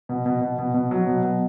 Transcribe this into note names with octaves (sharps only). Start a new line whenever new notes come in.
B2
B2
B2
B2
B2
F#3
B2
B2